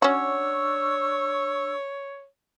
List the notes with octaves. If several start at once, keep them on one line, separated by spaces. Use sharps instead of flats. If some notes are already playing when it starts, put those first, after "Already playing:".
C#4 D4 F#4 C#5 C#6 E6